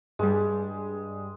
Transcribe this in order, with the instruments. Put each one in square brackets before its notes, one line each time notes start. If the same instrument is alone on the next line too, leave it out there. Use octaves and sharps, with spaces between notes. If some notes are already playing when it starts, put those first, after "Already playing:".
[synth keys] G2 G3 [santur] G#3